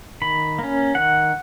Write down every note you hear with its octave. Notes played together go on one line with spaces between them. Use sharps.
D#3 B5
A#3 C#4
D#3 F#5